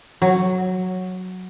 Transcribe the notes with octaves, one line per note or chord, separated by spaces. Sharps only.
F#3